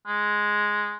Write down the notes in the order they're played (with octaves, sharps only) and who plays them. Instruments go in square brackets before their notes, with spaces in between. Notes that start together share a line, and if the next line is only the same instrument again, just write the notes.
[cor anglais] G#3